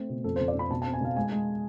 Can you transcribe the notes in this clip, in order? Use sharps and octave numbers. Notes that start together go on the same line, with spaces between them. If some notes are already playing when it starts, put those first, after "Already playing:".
Already playing: A3 C4
B2
F2 A4
F2 C5
D5
F2 B5
B2 A5
C4 A5
G#5
B2 F5
G#3 G#5
G#3